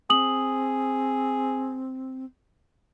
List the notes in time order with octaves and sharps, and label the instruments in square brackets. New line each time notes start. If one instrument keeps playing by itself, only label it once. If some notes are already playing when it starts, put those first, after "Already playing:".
[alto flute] C4 [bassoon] G#4 [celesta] D#6 F#7